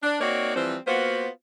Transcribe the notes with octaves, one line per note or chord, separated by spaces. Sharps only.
D4
A#3 C4 D#4 F#4 C#5 D5
E3 F3 G3 C4
A#3 B3 F4 F#4 C5